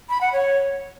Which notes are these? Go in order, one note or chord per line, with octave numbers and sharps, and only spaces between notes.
B5
F#5
C#5